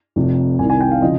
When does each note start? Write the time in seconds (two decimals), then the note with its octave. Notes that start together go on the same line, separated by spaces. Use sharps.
0.16 F1 F2 C3
0.59 C2 C3 D#3 G#5
0.70 G#5
0.80 G5
0.91 F5
1.02 C#3 F3 D#5